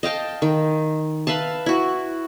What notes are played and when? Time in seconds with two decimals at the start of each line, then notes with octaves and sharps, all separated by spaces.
0.03 D#5 F5 G5 A5
0.42 D#3
1.27 B4 E5 F5 A5
1.66 E4 F#4